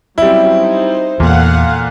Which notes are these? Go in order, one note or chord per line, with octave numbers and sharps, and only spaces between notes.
F#3 G3 C4 C#4 E4
D#4 C5
E2 A#2 A4 F5 F#5